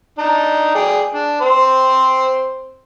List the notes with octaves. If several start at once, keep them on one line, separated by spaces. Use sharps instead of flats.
D4 D#4
G#4 D5 G5
D4
C4 C5